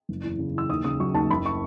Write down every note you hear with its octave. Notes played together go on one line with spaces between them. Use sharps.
F#1
E2
C#3
E3 E6
D#2 D#6
C#3 D#6
F#3 C#6
D#2 A5
F#1 B5
C#6